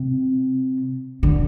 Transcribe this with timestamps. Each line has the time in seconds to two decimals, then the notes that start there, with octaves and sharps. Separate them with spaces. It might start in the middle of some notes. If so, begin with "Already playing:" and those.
Already playing: C3
1.23 D3